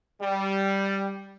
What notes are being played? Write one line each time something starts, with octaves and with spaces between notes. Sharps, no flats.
G3